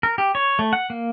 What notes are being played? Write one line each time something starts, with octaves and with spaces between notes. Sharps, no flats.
A#4
G4
C#5
A3
F#5
A#3